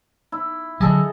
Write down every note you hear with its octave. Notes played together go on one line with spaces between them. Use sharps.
E4
D3 F#3 G#4 A4 D#5